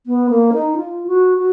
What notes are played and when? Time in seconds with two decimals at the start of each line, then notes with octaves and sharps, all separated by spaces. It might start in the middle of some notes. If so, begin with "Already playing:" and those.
0.06 B3
0.30 A#3
0.53 D#4
0.76 F4
1.07 F#4
1.38 F#4